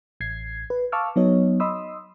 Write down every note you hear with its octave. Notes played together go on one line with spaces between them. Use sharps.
A1 G#6 C7
B4
F5 A5 C#6 D6 E6 F6
F#3 B3 D#4 C#5 D#5
D#5 B5 C6 D#6 E6